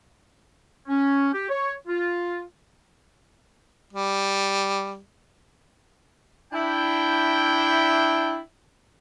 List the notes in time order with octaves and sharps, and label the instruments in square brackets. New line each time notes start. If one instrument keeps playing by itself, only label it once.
[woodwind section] C#4
G4
C#5
F4
[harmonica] G3
[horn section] D4 E4 G5